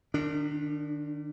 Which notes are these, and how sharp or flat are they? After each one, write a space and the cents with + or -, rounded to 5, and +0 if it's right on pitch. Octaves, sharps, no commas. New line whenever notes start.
D#3 -40 D4 +0